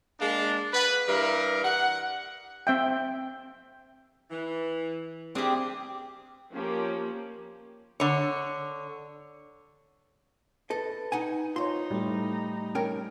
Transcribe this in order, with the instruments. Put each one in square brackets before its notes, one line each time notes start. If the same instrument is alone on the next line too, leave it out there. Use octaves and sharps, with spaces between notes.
[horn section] G#3 A#3 D4
B4
G2 E3 A#4
F#5
[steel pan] C4 E5 G5
[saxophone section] E3
[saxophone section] G3 D4 G#4 [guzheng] C4 G4
[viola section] F3 A#3 C#4 G4
[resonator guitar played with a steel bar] D3 C#5
[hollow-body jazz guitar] A4 D#5 [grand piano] B4
[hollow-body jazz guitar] D#4 F#5 G#5
[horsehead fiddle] D#4 [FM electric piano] F4 C#5 [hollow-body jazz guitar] C5 C6
[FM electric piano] A2 A3 [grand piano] G3
[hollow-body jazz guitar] C#4 A#4 G5